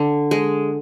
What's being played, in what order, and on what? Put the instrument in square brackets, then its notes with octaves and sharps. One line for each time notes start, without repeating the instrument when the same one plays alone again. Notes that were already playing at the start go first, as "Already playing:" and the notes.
Already playing: [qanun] D3
G#3